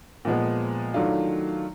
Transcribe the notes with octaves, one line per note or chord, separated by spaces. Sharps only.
A#2 F3 G#3 B3
D#3 F#3 A3 D4 F4